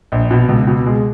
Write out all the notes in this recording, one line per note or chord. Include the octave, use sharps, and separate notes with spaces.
A#1
B2
C#2
B2
G#3